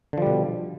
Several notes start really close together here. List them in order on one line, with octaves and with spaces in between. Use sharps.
D3 F3 G3 B2